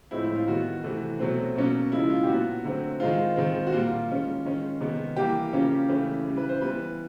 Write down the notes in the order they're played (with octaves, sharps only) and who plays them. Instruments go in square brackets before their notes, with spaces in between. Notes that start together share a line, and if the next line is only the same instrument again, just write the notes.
[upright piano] A2 F3 G#3 C4 E4
E4
F4
D#3 G3 B3 F#4
C3 E3 A3
B2 F#3 A3 C4
B2 F#3 A#3 C#4
C#3 F3 G#3 E4
F4
G4
A#2 F#3 B3 F#4
D3 F#3 A3 C4
D#3 G#3 C4 F4
D#3 G#3 C4
F#4
A#2 G3 A#3 F4
D#3 G#3 C#4
D#3 G#3 C#4
C3 D#3 G#3 B3
E3 G3 A#3 G4
C#3 F3 A#3 C#4
C#3 E3 A3 C#4
C#3 E3 G3
B4
C5
E3 G3 B3 B4